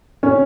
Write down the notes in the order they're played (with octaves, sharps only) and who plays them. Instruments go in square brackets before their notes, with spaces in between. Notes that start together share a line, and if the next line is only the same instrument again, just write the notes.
[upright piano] C#4